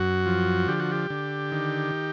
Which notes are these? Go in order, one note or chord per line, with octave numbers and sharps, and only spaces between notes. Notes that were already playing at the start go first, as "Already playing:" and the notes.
Already playing: F#2 F#4
F3
D3 G4
F#4
G4
D3
D#3